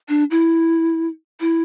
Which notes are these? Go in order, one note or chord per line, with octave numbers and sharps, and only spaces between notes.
D4
E4
E4